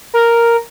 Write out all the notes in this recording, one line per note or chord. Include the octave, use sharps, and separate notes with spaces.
A#4